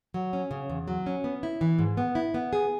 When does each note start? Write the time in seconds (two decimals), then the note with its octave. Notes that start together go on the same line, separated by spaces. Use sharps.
0.14 F#3
0.33 C#4
0.51 C#3
0.70 E2
0.88 F#3
1.06 C#4
1.24 B3
1.43 E4
1.61 E3
1.79 G#2
1.97 B3
2.15 E4
2.34 B3
2.53 G#4